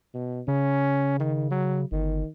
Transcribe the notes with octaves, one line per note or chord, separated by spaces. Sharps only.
B2
C#3 C#4
D#3
F#3
G1 D#3